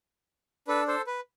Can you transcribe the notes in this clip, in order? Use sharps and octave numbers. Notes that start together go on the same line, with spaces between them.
D4 A4 B4
A4 C5
B4